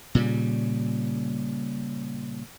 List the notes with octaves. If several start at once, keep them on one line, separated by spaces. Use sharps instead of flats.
A#2 C#3 G3